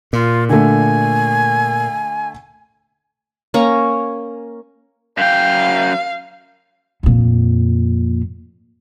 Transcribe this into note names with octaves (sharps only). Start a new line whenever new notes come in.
A#2 F4
D3 A3 G#5
A#3 C#4 A#5 C#6
F#2 F5 G5
F2 A#2